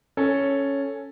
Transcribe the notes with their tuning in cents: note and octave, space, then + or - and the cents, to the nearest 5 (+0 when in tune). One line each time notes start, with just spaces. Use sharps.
C#4 +0 A4 +0